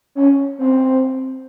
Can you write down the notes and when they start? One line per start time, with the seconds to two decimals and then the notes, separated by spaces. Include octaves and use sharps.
0.15 C#4
0.58 C4